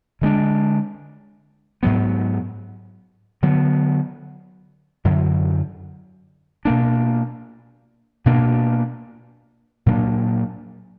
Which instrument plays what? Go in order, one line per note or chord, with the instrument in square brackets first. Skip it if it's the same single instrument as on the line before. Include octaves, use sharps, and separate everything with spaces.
[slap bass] D3 G#3 B3 D4
G#2 F#3 B3
D3 F#3 B3
F#2 D3 F#3
B2 A#3 D4
B2 A#3 D4
A#2 F#3 A#3 D4